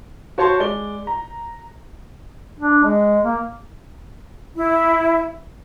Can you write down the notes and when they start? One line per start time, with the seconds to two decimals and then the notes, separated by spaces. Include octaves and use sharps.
0.38 F#4 C5 C#5 A5 C6
0.60 G#3 D5 G7
1.07 A#5
2.60 D4
2.84 G#3
3.24 A#3
4.55 E4